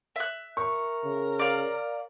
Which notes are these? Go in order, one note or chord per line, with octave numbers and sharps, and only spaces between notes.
E5 F#6
A#4 C#6
C#3
D5 F5